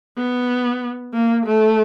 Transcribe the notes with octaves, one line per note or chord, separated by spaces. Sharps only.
B3
A#3
A3